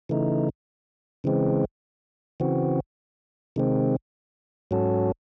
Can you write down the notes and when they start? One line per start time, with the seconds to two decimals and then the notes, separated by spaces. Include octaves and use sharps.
0.09 C#3 E3 A3 D#4
1.24 C#3 E3 G#3 C4
2.40 C#3 E3 C4 F#4
3.56 C3 D#3 G#3 C4
4.71 G#2 F#3 C#4 F#4 A4